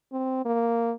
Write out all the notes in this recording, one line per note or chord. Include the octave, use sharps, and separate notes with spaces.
C4
A#3